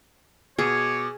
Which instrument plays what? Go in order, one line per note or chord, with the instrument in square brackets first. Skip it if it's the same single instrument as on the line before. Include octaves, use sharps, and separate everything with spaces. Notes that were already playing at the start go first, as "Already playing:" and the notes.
[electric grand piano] B2 [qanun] G#4 [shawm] C#5 [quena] D6